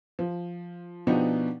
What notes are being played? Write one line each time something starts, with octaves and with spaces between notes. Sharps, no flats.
F3
B2 F3 B3 D4 D#4 G4